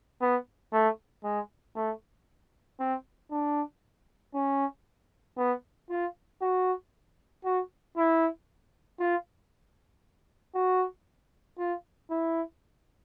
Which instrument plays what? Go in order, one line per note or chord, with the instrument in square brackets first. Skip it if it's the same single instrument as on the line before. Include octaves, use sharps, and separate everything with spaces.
[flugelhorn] B3
A3
G#3
A3
C4
D4
C#4
B3
F4
F#4
F#4
E4
F4
F#4
F4
E4